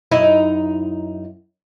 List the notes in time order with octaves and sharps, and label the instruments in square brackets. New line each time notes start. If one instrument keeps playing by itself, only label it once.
[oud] F#2 D#4 E4